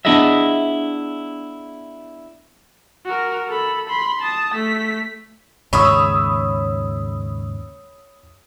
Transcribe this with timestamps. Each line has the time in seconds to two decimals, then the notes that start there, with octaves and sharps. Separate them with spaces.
0.05 B3 D4 E4 G#4 D#5 E5
3.06 F#4 A#4
3.49 A4 B5
3.88 B5 C6
4.22 A5 D#6
4.55 A3 B6
5.73 D#2 G#2 C#3 C#5 E5 B5 D#6 E6